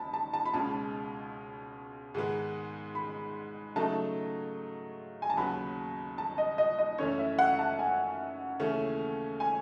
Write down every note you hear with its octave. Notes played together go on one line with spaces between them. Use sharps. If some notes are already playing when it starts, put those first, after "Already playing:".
Already playing: D#2 A5 B5
A5
A5
B5
C#2 B2 G#3 C#4 A5
G#2 D#3 G#3 B3
B5
C#3 F#3 A3 D#4 A5
G#5
A5
D#2 C#3 F#3 B3 B5
A5
D#5
D#5
D#5
F#2 E3 A3 C#4 C#5
E5
F#5
A5
G#5
D#2 C#3 E3 A3 C#4
G#5